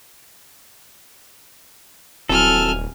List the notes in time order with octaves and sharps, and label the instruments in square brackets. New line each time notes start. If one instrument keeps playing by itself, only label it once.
[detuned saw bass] D#1 [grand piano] F#3 C4 E4 [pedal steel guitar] A4 [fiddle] G#5 F6